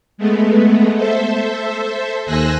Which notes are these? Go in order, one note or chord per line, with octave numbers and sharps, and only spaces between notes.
G#3 A3 B3
A4 C5 E5
D#2 C5 G#5 E6 F#6 A#6